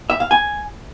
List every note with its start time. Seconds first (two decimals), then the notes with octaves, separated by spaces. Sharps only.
0.10 E5
0.20 F5
0.31 G#5